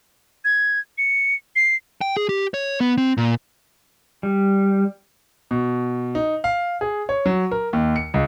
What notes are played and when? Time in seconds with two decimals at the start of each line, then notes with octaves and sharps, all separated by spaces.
0.45 G#6
0.98 C#7
1.56 C7
2.01 G5
2.17 G#4
2.29 G4
2.54 C#5
2.80 B3
2.98 C4
3.17 A#2
4.23 G3
5.51 B2
6.15 D#4
6.44 F5
6.81 G#4
7.09 C#5
7.26 F#3
7.51 A#4
7.73 D#2
7.96 C#7
8.14 C#2